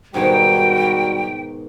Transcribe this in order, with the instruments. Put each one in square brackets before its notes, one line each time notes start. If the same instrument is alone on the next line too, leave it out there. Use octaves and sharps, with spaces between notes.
[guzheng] G#2 B2 D#3 [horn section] G3 F#4 [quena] G5